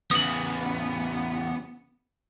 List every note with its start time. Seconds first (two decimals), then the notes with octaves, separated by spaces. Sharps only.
0.11 E2 C#3 B3 D#6 F#7